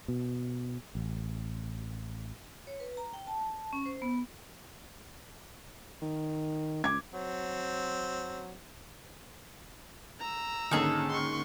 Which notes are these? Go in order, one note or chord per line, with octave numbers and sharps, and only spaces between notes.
B2
A1
C#5
B4
A#5
G5
A5
C#4
C5
B3
D#3
C#2 D6 G#6
F#3 C4
A#5 E6
G#2 D3 D#3 A#3 C#4 D#4 G#4 A4
C6 C#6